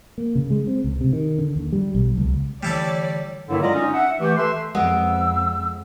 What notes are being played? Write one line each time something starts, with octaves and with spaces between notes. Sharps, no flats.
A#3
C#3
G#3
C4
C#2
C3
D#3
D3
D#2
G3
B1
C#2
D3 E3 G3 A3 E4 A4 C#5 D5
G2 D3 D#3 F#3 A#3 E4
G#3 F4 D5 D#5 A#5
C#4 D#4
E5 F#5
E3 A3 G4
A4 B4 E5 C6
F2 G#3 B3 E6 D7